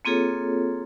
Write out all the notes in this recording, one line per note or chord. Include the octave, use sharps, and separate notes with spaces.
A#3 C4 F4 G#4 A4 C#5